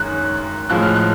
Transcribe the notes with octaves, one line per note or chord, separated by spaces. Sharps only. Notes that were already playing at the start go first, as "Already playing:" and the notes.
Already playing: F#2 D#3 G#3 C#4 F#6
A2 F3 G#3 F#6
F6
F#6